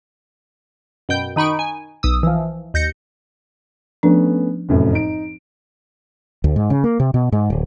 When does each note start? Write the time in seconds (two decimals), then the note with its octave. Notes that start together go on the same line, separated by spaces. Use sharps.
1.09 F#2 B2 G5 G6
1.36 D#3 D#4 B5 C#6 D7
1.59 G#5
2.03 B1 D#6 E6
2.23 E3 F3
2.74 D#2 G6 A#6 C#7
4.03 F3 A3 B3 C#4 D4
4.69 F1 F#2 A2
4.93 D#4 D7
6.44 D2
6.56 G#2
6.70 C#3
6.84 A#3
7.00 C3
7.14 B2
7.32 G#2
7.50 D1